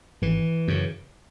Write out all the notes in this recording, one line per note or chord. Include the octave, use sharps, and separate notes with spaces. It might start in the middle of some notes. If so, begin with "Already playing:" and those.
G#1 E3
F#2 C#3